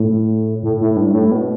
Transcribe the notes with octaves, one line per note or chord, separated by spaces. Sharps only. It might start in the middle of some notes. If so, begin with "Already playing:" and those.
Already playing: A2
A2
A2
G2
A2
B2